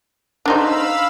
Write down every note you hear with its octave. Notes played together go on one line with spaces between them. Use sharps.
D4 D#4 C5 F5 B5 E6